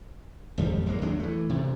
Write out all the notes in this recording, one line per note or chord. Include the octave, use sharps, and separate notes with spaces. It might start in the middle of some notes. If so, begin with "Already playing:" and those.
G#1 F2 G3
F#1 F#2 G#3 A#3
D#2 F#3 G#3 D4
E3 A3
D2 C3